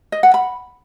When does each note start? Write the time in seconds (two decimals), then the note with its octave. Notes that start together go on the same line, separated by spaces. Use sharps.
0.12 D#5
0.23 F#5
0.34 B5